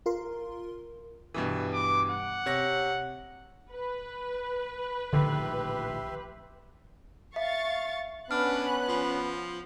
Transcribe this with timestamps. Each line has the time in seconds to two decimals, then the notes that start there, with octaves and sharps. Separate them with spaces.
0.06 F4 A#4 C6
1.34 G2 B2 E3
1.73 D6
2.10 F#5
2.46 C3 C#5 A#6
3.73 B4
5.13 A#1 A2 D3 D#3 G4 E5 C6
7.36 E5 F5 C#6 A6
8.31 B3 C#4 D4 B4 F6 F#6
8.89 F3